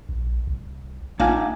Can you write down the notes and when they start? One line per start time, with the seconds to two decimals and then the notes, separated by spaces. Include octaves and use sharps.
0.09 A#1
0.47 C2
1.20 A1 A#3 D#4 F4 E5 G#5 A5